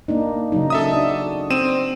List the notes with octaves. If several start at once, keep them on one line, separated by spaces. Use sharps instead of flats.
A#3 D4 D#4
C#3 F#3 D#4
A4 E5 D#6
D4 F#4
C4 D#7 E7